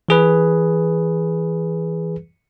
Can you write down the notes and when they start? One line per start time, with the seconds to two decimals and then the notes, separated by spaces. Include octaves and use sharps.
0.09 E3 G#4 B4